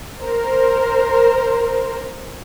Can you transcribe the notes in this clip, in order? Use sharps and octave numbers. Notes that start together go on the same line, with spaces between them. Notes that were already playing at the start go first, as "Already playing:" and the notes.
A#4 C5